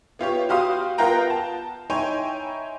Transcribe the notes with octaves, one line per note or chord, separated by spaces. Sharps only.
B3 F4 G4 C#5
F#4 G4 F5 C6 D#6
B3 F4 A#4 F#5 G5 A#5
A5
D#4 E4 C#5 G5 G#5 C6